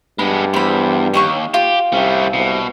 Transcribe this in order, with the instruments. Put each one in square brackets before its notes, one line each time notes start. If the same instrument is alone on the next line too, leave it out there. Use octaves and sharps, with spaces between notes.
[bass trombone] G2 [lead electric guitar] G#3 B3 [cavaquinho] B5
[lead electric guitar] E2 [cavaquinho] C5 B5
[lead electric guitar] D#2 [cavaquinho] G4 C#5 C#6
[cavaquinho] F4 [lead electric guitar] G4
[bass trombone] C2 [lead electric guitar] G3 C#4
[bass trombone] C2 [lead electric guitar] B2